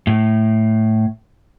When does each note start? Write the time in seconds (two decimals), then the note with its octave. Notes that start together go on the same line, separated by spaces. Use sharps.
0.07 A2